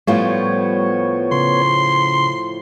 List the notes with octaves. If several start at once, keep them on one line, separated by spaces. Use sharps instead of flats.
A2 F3 G3 B3 F4 C#5
C#3 C6